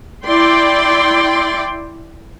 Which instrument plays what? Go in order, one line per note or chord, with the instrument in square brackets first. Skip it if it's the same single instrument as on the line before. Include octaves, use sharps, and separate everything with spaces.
[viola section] E4 D5 G5 C6